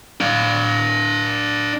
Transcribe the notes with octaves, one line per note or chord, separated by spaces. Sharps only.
D4 F5